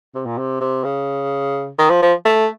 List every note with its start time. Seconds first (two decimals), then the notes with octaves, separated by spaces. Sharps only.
0.15 C3
0.26 A#2
0.38 C3
0.61 C3
0.84 C#3
1.79 D#3
1.91 F3
2.03 F3
2.25 A3